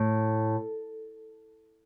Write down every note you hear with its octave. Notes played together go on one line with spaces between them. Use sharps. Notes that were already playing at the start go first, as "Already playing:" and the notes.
Already playing: A2